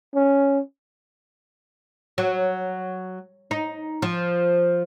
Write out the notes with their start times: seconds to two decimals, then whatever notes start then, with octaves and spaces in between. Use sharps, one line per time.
0.14 C#4
2.18 F#3
3.51 D#4
4.02 F3